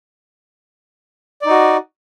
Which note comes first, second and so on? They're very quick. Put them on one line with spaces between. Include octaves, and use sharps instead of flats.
D5 D#4 F#4